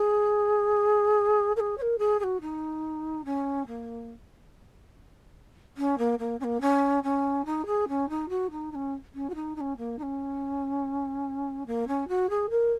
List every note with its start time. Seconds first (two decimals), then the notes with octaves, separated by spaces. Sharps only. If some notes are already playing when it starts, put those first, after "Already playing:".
Already playing: G#4
1.56 A#4
1.60 G#4
1.77 C#5
1.81 A#4
1.98 G#4
2.19 G#4
2.23 F#4
2.41 D#4
3.25 C#4
3.67 A#3
5.77 C#4
5.98 A#3
6.19 A#3
6.40 C#4
6.44 A#3
6.61 C#4
7.03 C#4
7.45 D#4
7.66 G#4
7.88 C#4
8.09 D#4
8.29 F#4
8.51 D#4
8.71 D#4
8.75 C#4
9.14 C#4
9.29 F#4
9.35 D#4
9.56 D#4
9.60 C#4
9.77 A#3
9.98 D#4
10.02 C#4
11.66 A#3
11.87 C#4
12.08 F#4
12.29 G#4
12.50 A#4